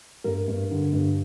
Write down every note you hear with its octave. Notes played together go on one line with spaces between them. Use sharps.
G2 A#4
G2
D3
G2